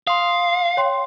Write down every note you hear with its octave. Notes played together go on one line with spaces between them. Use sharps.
F5 C6 D#6
C#5 G5 C6